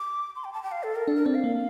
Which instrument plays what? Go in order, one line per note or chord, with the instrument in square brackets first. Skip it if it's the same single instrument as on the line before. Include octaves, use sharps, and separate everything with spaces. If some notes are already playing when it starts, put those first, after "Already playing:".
Already playing: [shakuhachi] D6
C6
G5
A5
G5
F5
A4
A#4
[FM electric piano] D4 [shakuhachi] A4
[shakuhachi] A#4
[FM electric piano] C4 [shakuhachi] D5
[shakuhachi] F5
[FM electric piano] A#3